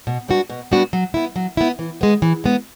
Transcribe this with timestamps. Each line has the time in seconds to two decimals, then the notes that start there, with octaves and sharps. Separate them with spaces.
0.07 B2
0.28 G3 B3 D4 F#4
0.50 B2
0.71 G3 B3 D4 F#4
0.93 F#3
1.14 B3 E4
1.36 F#3
1.57 B3 E4
1.79 E3
2.01 G#3 B3
2.22 E3
2.44 G#3 B3